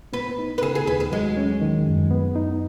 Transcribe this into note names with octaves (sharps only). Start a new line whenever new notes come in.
B3 B4
D#4
B4
C#3 G#4
G#4
D#2 B4
G#4
F#3 G#3
C#4
D#3
F#2
B3
D#4